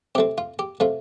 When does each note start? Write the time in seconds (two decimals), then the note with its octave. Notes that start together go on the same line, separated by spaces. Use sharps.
0.15 C3 A3 C4 G4
0.38 F4
0.59 G4
0.80 C3 A3 F4